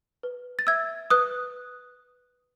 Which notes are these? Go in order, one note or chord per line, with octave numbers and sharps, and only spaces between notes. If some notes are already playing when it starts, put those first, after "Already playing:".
B4
A6
E5 E6 G#6
B4 D#6 F#6